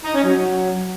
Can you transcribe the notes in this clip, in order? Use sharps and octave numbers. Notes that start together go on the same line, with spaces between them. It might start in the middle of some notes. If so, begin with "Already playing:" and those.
D#4
C#4
F#3